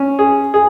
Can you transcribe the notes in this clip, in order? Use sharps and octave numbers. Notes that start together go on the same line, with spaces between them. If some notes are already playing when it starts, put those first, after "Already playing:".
Already playing: C#4
G#4
G#4